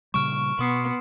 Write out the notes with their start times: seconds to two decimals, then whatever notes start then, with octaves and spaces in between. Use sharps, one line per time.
0.14 A#2 C#3 G3 C#6 F6 D7 E7
0.59 B2 B3 C6 D#6 C7